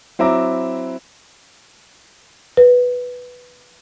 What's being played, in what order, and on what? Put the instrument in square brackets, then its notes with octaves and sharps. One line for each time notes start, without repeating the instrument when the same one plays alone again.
[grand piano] F#3 C4 E4 E5 A#5 D6
[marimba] B4